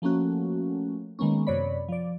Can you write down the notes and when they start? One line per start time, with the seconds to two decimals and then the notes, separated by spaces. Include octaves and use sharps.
0.02 F3 A3 A#3 C#4 F#4
1.19 D#3 G#3 A#3 B3 C#4
1.47 F#2 C3 C#5 D5 B5
1.89 F3 D5